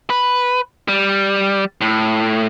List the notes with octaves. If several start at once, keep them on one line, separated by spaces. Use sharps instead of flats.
B4
G3
A2